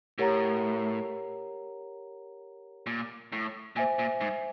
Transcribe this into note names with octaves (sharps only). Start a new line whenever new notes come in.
A2 G4 A#4 C#5 F#5 A#5
A#2
A2
A#2 C5 E5 G#5
A#2
G#2